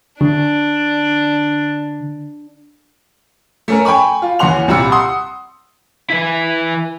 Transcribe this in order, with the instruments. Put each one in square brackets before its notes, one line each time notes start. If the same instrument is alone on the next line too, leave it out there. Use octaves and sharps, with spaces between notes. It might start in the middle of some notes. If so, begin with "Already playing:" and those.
[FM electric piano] D3 [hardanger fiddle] D4
[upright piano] A3 C#4 A#4
G5 G#5 B5 C#6
F4
D#2 E3 C#4 F#5 C6 F7
C2 A#2 G3 B5 E6 C#7
F#5 C6 D#6
[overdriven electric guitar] E3 E4